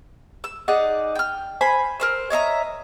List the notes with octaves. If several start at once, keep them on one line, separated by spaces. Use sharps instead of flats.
E6
D#4 G#4 D5 F#5
G5 F6
C5 G#5 B5
A#4 C5 E6
C#5 D#5 E5 A#5